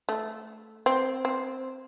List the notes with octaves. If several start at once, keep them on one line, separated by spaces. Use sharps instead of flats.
A3
C4
C4